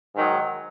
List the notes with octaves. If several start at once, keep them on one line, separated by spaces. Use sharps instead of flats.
G#2 D#3 F#3